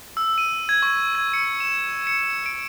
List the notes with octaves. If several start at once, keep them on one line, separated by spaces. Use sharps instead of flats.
E6
D#7
G#6
C#6
G#6
C#7
E7
C#7
D7